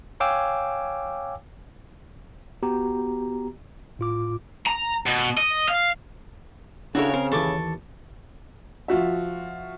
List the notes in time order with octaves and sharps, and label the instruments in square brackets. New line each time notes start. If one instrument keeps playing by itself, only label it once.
[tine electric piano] C#5 F5 G5 G#5 D6 E6
B3 F#4 G4 A#5
A2 F4 D6
[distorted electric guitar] A#5
B2
D#5
F5
[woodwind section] C#3 [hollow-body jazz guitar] D4 E4 A4 [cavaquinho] F#4 A#4 C#5
[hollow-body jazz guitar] C4 [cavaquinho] A#4 F5
[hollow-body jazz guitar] D#2 E3 [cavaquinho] A4 C#6 D6
[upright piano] F3 F4 F#4 E5